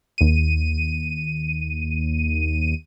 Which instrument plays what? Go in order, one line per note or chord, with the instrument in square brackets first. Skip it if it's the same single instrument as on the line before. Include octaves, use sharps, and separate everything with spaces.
[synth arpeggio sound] D#2 D#7